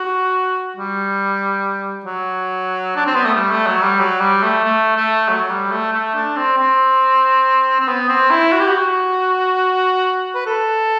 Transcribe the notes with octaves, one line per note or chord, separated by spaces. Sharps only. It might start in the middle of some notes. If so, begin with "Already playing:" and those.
Already playing: F#4
G3
F#3
D4
C4
B3
A3
G3
A3
F#3
G3
F#3
G3
A3
A3
A3
F#3
G3
A3
A3
D4
C4
C4
C4
B3
C4
E4
F#4
G4
F#4
B4
A4